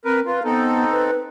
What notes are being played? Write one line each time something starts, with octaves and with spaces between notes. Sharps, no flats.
C4 A#4 B4
F4 B4
B3 C4 D#4 A4
B4